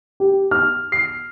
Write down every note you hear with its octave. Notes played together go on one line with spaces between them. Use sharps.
G4
F6
C7